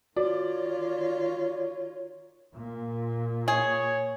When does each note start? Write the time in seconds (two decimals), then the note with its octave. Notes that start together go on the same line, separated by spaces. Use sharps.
0.17 D#3 F4 F#4 C#5 D5
2.54 A#2
3.48 G#4 C#5